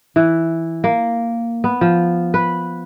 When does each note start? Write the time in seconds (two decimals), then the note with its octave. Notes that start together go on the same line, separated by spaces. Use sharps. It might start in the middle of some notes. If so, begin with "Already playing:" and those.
0.16 E3
0.84 A#3
1.64 B3
1.81 F3
2.34 B4